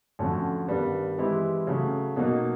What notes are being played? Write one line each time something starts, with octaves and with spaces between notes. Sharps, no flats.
F2 D3 F#3 A3 C#4
G2 D#3 G3 B3
E3 G#3 C4 E4 G4
C#3 F#3 A3
B2 F#3 A#3 D#4